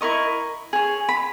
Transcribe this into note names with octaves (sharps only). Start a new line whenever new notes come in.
E4 A#4 D#5 C#6
G#4 C#5
B5